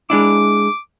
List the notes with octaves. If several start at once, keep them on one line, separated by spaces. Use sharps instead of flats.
G#3 D4 E4 D6